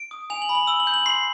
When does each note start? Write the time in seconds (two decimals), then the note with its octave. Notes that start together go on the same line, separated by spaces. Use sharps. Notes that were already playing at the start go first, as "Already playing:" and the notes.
Already playing: D7
0.11 D#6
0.30 G#5 F7
0.42 F#7
0.49 B5
0.55 F#7
0.67 E6 G7
0.80 F#7
0.87 G6
0.94 F#7
1.06 C6 C7